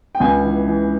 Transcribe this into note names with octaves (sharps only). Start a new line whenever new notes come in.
G5
C#2 G#5
E3
E3